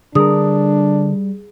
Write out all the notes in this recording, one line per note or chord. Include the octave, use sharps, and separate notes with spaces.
D3 G3 D4 G#4 A#4 D#6